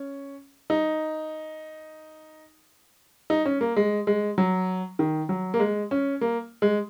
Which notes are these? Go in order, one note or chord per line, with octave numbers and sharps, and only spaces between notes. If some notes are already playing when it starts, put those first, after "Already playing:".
Already playing: C#4
D#4
D#4
C#4
A#3
G#3
G#3
F#3
D#3
F#3
A#3
G#3
C#4
A#3
G#3